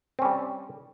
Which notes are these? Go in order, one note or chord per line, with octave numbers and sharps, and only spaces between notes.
G3 C4 C#4